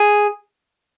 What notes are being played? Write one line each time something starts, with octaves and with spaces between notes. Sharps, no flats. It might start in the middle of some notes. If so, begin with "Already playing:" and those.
Already playing: G#4